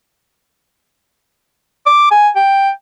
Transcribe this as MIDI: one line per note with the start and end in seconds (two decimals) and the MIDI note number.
1.86 2.10 86
2.11 2.29 80
2.36 2.70 79